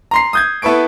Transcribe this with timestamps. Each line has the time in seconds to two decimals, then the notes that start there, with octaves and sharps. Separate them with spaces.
0.11 A#5 C6 C7
0.33 D#6 G6 G#6
0.62 B3 E4 A4 B4 C#6 D7